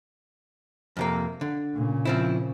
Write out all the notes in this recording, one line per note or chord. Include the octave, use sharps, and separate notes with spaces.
F2 C3 A#3
D3
A#2 C#3
F3 C4 E4